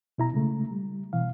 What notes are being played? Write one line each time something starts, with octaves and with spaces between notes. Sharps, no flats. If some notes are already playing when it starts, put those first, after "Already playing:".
B2 E4 A#5
C#3 G#3 A3
G3
B2 E3 F5